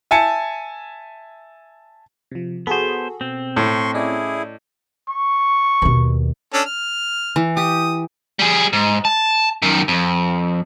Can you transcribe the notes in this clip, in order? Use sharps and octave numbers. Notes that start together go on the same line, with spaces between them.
E5 G#5 A5 C#7
C3 F3
B3 F#4 G#4 A4 C5
B2 C4
A2 C6 C#6
C#4 E4 G#4 D5 D#5
C#6
D#2 B2
C#4 D4 A4
F6
E3
G4 D#6
G3 G#4
G#2
A5
F#2 D#3
F2